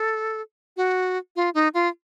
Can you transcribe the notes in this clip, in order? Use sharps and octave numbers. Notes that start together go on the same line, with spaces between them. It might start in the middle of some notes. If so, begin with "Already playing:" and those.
Already playing: A4
F#4
F4
D#4
F4